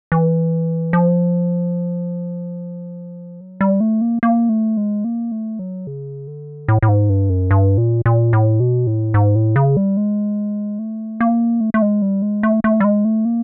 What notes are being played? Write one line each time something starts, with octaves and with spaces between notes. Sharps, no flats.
E3
F3
F#3
G3
A3
A#3
A#3
A3
G#3
A#3
A3
F#3
C#3
D3
A2
A2
G#2
G2
F#2
G2
A#2
A#2
A2
B2
A2
G#2
A2
C#3
G3
G#3
A3
A#3
A3
A3
G#3
G3
G#3
A3
A3
G3
G#3
A3
A#3